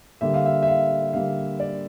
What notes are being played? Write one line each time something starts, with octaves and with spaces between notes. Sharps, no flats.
D3 G3 A#3 E5
F5
E5
E5
F5
D3 G3 A#3 F5
D5